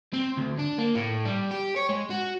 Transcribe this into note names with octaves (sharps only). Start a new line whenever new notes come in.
C4
D2
D4
A#3
A2
G3
G4
C#5
G#3
F#4